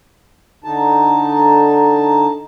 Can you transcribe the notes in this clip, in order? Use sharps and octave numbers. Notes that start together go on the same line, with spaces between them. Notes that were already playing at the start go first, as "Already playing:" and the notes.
D3 D#4 A5